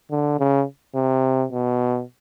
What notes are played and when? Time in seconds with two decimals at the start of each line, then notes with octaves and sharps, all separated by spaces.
0.11 D3
0.39 C#3
0.95 C3
1.52 B2